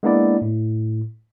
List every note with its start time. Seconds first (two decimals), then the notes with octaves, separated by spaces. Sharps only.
0.03 G#3 A#3 B3 D4 E4 D5
0.42 A2